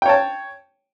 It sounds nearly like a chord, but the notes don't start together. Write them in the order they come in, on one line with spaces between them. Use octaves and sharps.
G5 C#5 A5